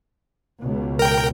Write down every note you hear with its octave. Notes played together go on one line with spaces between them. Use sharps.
C#2 B2
A#4 G5